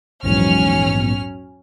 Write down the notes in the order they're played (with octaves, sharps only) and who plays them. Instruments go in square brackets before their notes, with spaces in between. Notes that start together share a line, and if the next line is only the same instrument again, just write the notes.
[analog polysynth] A#1 E2 G#2 [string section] F#3 C#4 F6